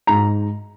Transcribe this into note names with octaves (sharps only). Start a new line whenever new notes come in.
G#2 A#5